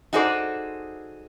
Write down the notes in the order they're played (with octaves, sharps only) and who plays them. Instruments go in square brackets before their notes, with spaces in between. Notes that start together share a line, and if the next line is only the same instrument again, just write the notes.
[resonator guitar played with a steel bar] D#4 F#4 G#4 A4 C5 D5